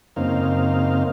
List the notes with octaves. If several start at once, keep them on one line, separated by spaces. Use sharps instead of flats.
F#2 C#3 A#3 C4 D#4 F5